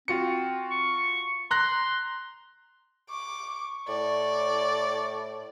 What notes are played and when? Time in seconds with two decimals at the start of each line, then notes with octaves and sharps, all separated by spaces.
0.08 C4 F4 F#4 C#7
0.70 C#6
1.51 A#5 C6 F#6 A#6
3.10 C#6 D6
3.88 A2 D5